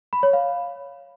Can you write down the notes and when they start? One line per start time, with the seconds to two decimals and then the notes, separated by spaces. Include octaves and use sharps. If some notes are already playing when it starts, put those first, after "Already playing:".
0.13 B5
0.23 C#5
0.33 F5